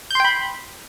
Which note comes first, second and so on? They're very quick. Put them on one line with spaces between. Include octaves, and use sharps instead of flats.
G6 C6 G5 B5